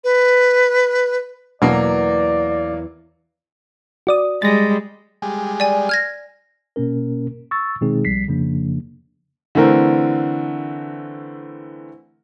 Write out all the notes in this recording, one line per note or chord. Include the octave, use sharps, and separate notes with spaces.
B4
E2 B2 F#3 A#3 D5
F#4 D5 D#6
G3 G#3 A6 A#6
G3 G#3
D5 G#5
F6 G#6 A#6
B2 A#3 C#4 A#4
C#6 E6 A6
B2 D#3 G#3 C4 D#4 G#4
B1 F3 G3 B6 C7
F2 C#3 F3 A#3 D4
D3 E3 A3 C4 A#4